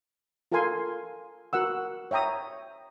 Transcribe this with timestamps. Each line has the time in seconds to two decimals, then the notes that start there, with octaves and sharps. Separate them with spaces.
0.52 F4 A4 A#4 F5 G#5 C6
1.53 F#4 A#4 F#5 E6
2.11 C#5 E5 G5 A#5 D#6